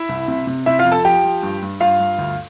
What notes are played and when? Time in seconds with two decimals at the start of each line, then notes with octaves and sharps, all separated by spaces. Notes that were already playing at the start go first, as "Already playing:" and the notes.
Already playing: E4 E5
0.09 C2
0.28 C3
0.47 C3
0.66 C3 E4 E5
0.79 F4 F5
0.85 F2
0.92 A4 A5
1.05 F3 G4 G5
1.24 F3
1.43 G2
1.62 G2
1.80 G2 F4 F5
2.00 G2
2.18 D2